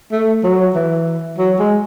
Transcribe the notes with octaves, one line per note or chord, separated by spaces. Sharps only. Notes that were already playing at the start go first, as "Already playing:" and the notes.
A3
F#3
E3
F#3
G#3